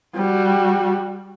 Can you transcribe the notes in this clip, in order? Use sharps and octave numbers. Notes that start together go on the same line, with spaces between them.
G3 F#4